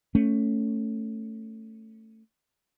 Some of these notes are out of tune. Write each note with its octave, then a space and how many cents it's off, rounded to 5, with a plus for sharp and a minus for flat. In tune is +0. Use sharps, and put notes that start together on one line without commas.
A3 +15 C#4 +0